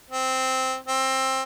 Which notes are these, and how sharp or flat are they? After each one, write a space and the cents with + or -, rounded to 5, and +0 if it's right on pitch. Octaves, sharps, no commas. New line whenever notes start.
C4 -5
C4 +15